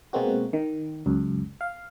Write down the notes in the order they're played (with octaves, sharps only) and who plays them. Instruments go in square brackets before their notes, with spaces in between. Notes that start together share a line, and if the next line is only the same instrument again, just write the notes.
[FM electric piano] B2 G#3 A#3 C4 F#4
D#3
C#2 F#2
F5